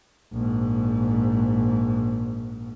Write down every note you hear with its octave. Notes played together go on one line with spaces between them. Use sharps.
A#1 G#2